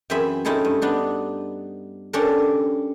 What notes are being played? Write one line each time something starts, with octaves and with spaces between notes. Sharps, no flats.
F#2 E3 C4 G#4 E5 B5
C4 C#4 D#4 E4 G#4 A4
G2
B3 D4 D#4
C#4 D4 G4 A4 A#4